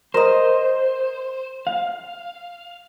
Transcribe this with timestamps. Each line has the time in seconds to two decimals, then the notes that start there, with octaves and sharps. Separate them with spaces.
0.14 A#4 C5 D#5
1.67 F5